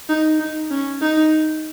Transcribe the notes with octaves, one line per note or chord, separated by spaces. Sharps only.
D#4
D#4
C#4
D#4